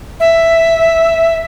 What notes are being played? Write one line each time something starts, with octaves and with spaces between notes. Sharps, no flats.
E5